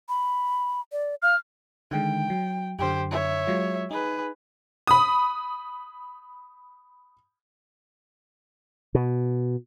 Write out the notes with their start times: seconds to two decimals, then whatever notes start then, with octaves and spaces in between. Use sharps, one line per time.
0.09 B5
0.92 D5
1.23 F5 F6
1.91 D3 D#3 G#3 G5
2.30 F#3
2.79 F#2 D3 G4 C5
3.11 C#5 E5
3.47 F#3 G#3 F4
3.91 D#4 G#4 B4
4.87 B5 D#6
8.95 B2